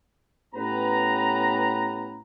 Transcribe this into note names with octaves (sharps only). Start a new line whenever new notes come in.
A2 B3 C#4 G4 B4 A#5